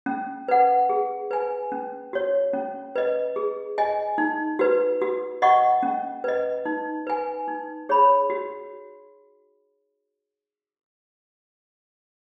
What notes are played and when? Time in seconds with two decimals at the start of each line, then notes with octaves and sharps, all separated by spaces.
0.06 C#4
0.48 B4 F#5
0.89 G#4
1.31 B4 G#5
1.72 C#4
2.13 F#4 C#5
2.53 C#4
2.96 B4 D#5
3.36 G#4
3.78 D#5 G#5
4.18 D#4
4.59 F#4 B4
5.01 F#4
5.42 D#5 F#5 C#6
5.83 C#4
6.24 B4 D#5
6.66 D#4
7.07 B4 G#5
7.48 D#4
7.89 G#4 C#5 B5
8.30 F#4